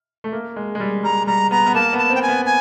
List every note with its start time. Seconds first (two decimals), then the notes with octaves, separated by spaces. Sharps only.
0.24 A3
0.32 A#3
0.56 G#3
0.75 G#3
0.80 G3
1.03 G3 A#5
1.27 G3 A#5
1.51 B3 A#5
1.66 B3
1.75 A#3 A5
1.93 B3
1.98 A5
2.10 C4
2.15 G5
2.22 G#5
2.29 B3
2.46 G#5